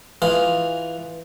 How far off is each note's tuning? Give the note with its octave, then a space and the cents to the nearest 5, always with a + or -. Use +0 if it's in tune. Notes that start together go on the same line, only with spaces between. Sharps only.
E3 +0 F4 +0 G#4 -5